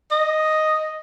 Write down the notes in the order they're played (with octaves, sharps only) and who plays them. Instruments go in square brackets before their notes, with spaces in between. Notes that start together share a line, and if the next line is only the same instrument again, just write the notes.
[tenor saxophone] D#5